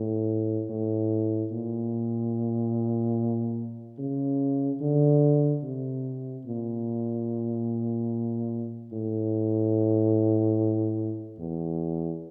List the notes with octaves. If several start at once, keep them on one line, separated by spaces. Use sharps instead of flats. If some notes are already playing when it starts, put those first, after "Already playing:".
Already playing: A2
A2
A#2
C#3
D3
C3
A#2
A2
E2